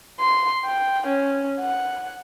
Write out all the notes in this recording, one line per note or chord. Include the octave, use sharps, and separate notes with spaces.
C6
G5
C#4
F#5